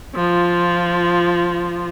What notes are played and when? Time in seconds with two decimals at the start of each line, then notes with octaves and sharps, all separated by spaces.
0.16 F3 F4